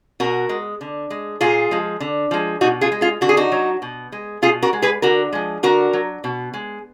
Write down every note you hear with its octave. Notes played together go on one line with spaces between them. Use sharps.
B2 F#4 A#4
G#3
D3
G#3
A#2 F4 G#4
F3 G#3
D3
F3 G#3
B2 D#4 F#4
F4 G#4
G#3
F4 G#4
D3 F#4
G#4
D#4 F#4
F#3
B2
G#3
B2 F4 G#4
F#4 A#4
G#3
G#4 B4
D3 F#4 A#4
F3 G#3
D3 F#4 A#4
F#3
B2
G#3